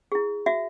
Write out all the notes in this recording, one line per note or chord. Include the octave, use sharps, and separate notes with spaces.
E4 G#4
F#4 E5